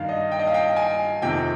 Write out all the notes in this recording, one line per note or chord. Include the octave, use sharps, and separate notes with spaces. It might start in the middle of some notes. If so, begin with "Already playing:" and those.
Already playing: G2 D#3 F5
D#5
G5
D#5
F5
G5
G#5
F2 C3 D#3 G5